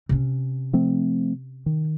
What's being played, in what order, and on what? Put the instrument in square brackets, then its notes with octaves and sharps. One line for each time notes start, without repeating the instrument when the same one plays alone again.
[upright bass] C3 C#4
[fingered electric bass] F3 A3 C4
D#3